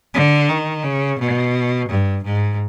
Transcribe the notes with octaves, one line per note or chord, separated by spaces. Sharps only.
D3
D#3
C#3
B2
G2
G#2